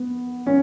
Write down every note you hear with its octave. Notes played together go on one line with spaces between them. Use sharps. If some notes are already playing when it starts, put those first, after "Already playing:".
Already playing: B3
C#4